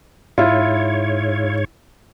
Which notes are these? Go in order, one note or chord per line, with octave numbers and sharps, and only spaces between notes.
G#2 E4 F4 C#5